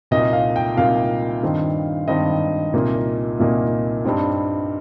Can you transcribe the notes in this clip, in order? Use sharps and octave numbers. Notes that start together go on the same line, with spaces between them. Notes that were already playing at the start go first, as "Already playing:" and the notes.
C2 A#2 A#3 D#4 D#5
F5
G5
C2 A#2 A#3 D#4 F5
G2 D#3 C4 D#4
G2 D#3 C4 D#4 D#5
C2 A#2 A#3 D#4
C2 A#2 A#3 D#4
G2 G3 C4 D#4